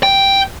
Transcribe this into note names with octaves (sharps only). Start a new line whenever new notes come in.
G5